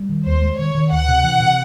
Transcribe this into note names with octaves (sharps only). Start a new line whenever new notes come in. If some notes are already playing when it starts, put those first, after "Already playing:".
Already playing: G3
D#3
D#2 C5
G#3
D#3 C#5
D#3
D2 F#5
C3
E3
C3